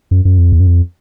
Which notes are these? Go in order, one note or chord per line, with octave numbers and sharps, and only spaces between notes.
F#2
F#2
F2
E2
F#2
F2